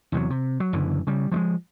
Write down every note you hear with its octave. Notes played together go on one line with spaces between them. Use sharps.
E2 C3 F3 F#3
C3
F#3
F#1 F#2 D3 E3
C#3 G3
F3 G3 G#3